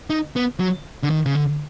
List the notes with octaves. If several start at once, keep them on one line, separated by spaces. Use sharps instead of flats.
D#4
B3
F#3
D3
D#3
C#3
D3